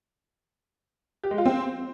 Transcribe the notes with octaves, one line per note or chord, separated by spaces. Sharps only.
G4
G#3
F4
C4